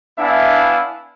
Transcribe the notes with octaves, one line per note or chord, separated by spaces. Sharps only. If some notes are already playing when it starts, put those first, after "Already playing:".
B3 D4 E4 E5 F5 G#5